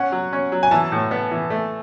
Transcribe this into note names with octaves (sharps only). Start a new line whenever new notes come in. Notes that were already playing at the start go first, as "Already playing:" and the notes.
Already playing: C#4 F#5
F#3
C#4
F#3
G#5
E3 A5
A2
B3
E3
A3